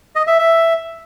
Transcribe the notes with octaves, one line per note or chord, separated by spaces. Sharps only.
D#5
E5
E5